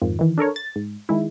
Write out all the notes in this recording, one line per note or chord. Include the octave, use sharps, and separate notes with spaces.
F2 G#2 D#3 F3
D#3 E3
D4 A4 A#4 C#5
A6
G#2
D#3 G#3 E4